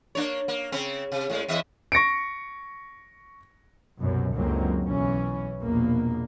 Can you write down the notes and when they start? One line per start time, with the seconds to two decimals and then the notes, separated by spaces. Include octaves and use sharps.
0.15 A#3 D4 C#5
0.48 A#3
0.72 C#3 C4
1.12 C3
1.30 A2 G#3
1.48 E2 D#5 E5
1.92 C#6 A#6 C#7 D7
4.00 C2 F#2 B2
4.35 C#2 F#2 D3 F#3 A#3 C4
4.83 B1 E3 C#4
5.61 A#1 E2 B2 A#3